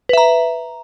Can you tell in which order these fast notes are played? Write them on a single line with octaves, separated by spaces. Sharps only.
B4 E5 A#5